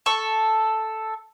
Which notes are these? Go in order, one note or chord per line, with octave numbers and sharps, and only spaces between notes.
A4 C#6